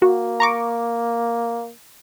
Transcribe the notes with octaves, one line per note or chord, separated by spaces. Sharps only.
A#3 F#4
A#5 C#6 D6